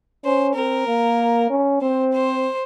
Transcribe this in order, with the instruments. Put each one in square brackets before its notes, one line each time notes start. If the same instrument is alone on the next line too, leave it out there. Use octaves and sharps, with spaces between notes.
[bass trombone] C#4 [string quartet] C5
[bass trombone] C4 [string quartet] A#4
[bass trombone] A#3
C#4
[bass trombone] C4 [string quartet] C5
[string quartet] C5